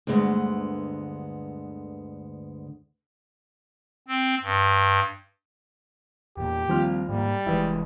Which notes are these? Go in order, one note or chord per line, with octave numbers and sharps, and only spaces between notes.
D2 G2 D3 G#3 B3
C4
G2
E2 A#2 G4
D#2 F3 G3 C4 F6
G#2 G3 A#3
F1 E3 G#3 E4 B4